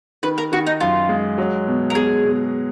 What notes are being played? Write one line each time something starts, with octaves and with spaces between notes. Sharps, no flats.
D#3 B4
A#4
D#3 F#4
D#4
F#2 F4
G#3
F#3
B2
A#4
B2 G#4
B2